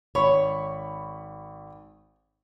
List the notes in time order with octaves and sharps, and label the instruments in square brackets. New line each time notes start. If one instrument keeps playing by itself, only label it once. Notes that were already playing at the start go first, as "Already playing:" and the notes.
[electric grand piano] G#1 B5 C#6 [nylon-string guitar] C#5